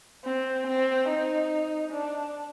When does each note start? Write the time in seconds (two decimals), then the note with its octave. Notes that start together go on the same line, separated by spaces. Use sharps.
0.24 C4
0.67 C4
1.09 D#4
1.92 D4